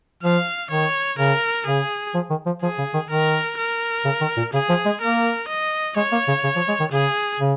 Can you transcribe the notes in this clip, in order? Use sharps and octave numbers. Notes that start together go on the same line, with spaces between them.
F3 F5
D#3 C#5
C#3 A#4
C#3 G#4
F3
D#3
F3
F3 G#4
C#3
D#3
D#3 A#4
A#4
C#3
D#3
A#2
C#3 G#4
F3
G#3
A#3 A#4
D#5
G#3 C#5
A#3
C#3
C#3
F3
G#3
D#3
C#3 G#4
C#3